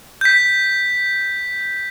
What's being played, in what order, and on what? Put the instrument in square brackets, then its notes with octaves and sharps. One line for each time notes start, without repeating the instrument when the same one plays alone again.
[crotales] G6 B6